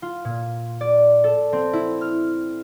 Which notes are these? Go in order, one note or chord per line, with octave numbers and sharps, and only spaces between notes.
F4
A#2
D5
A4
C4
E4
F6